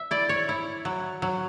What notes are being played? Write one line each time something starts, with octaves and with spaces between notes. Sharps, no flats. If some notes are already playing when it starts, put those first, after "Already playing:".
Already playing: E5
E4 D5
C#5
E4
F#3
F#3